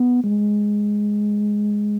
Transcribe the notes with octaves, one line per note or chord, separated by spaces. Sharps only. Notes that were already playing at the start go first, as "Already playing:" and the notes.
Already playing: B3
G#3